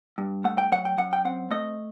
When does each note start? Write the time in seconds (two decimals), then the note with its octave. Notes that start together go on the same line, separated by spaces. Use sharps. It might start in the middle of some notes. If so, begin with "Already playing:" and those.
0.18 G2
0.44 A3 F#5
0.58 G5
0.72 F#3 F#5
0.85 G5
0.98 F#2 F#5
1.13 G5
1.25 C4 F#5
1.51 A3 D#5